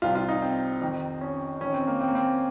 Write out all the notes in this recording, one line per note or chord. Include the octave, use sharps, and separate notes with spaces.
C2 C3 F3 F4
F4
D#4
C4
F2 D#3
C#4
F2 D#3 C#4
C4
A#3
C4
A#3
C4